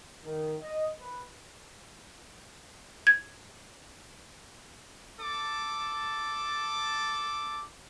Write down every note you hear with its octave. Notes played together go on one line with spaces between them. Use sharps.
D#3
D#5
B4
G#6
A4 A5 D6